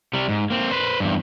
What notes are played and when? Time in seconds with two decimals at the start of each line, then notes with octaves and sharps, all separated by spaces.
0.13 C3 G3
0.29 G#2
0.50 A#3 C4
0.71 B4 C5
1.00 E2 G2